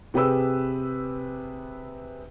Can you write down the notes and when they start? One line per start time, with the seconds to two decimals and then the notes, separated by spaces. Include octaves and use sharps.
0.14 C3 G4 G#4 B4 E6